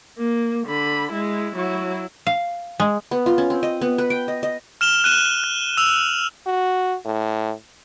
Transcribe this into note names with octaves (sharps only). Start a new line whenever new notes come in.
A#3
D3 B5
G#3 E4
F#3 E4
F5
G#3
B3
F4
C#4
C4
D#5
B3
B4
G5
D#5
D#5
F6 E7 F7 G7
F#6 D#7 E7
F#6
E6 F7 F#7
F#4
A2